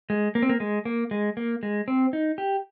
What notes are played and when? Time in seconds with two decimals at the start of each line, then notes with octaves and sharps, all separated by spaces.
0.10 G#3
0.35 A#3
0.43 C4
0.49 A#3
0.60 G#3
0.85 A#3
1.11 G#3
1.37 A#3
1.63 G#3
1.88 C4
2.13 D#4
2.38 G4